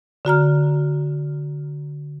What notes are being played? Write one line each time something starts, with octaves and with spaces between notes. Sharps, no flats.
D3 F#4 A#5 F6